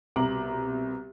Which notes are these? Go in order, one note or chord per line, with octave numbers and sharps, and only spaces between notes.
C2 B2 A#5 D6 F#7